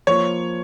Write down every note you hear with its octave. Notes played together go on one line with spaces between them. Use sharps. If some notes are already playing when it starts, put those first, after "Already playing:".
F3 A#3 F4 C#5